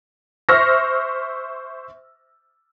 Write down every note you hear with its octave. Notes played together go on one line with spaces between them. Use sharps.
C5 E5 C#6 E6 F6 A#6